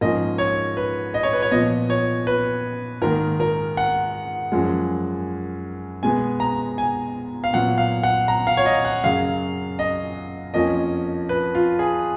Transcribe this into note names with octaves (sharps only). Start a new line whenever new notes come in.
G#2 F3 A#3 C#4 D#5
C#5
B4
D#5
C#5
B4
C#5
A#2 F3 B3 D#5
C#5
B4
G#2 D#3 A#3 A#4
A#4
F#5
F#2 F3 G#3
B2 G#3 B3 G#5
A#5
G#5
F5
A#2 F#3 B3 F#5
F5
F#5
A#5
F5
C#5
D#5
F#5
F#2 C#3 F#3 F5
D#5
F2 F3 A#3 C#4 D#5
B4
F4
G#4